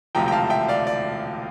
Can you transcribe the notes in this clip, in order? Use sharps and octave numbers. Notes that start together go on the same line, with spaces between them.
E1 D2 C3 F3 G5 A#5
G5
F5 A5
E5 G5
D5 F5
D5